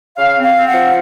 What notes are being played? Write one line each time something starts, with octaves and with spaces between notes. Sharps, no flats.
C#3 F5
C4
F5
C4
F#5
F3